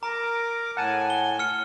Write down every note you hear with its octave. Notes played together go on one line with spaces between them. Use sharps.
A#4 A#5 D6
A2 F#5 G#5 A5
G7
F6 C#7